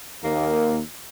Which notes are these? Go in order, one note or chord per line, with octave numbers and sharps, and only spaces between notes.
D#2 A#3